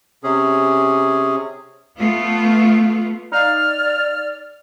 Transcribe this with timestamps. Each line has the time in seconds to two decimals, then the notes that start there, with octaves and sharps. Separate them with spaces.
0.24 C3 C#4 G#4
1.97 A3 B3 F4
3.32 D#4 D5 F5 F6